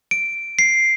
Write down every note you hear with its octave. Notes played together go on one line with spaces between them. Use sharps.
D7
C7